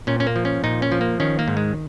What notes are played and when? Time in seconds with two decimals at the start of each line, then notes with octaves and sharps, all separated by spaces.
0.07 A#2 C#4
0.20 C#4
0.27 A#3
0.36 F3
0.45 C#4
0.64 A#2 D#4
0.82 C#4
0.92 F3
1.01 A#3
1.20 D#3 C#4
1.39 A#3
1.48 G#2
1.57 G#3